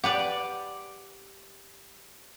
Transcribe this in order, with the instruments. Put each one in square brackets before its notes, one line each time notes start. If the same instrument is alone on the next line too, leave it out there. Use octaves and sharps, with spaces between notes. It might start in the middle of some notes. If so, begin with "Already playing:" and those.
[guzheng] G4 B4 D5 [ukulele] F#5